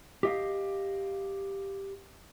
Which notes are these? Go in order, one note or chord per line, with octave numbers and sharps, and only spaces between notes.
G4 D#5 F5